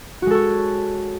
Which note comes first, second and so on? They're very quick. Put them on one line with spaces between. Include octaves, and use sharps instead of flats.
F#4 G#3 A4 C#5